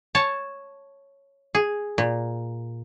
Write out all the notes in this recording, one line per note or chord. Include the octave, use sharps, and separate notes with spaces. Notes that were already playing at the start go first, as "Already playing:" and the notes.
C#5 A5
G#4
A#2